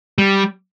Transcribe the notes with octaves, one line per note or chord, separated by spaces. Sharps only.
G3